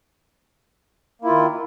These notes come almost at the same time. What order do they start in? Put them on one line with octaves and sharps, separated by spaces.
A#3 E4 F4 D#3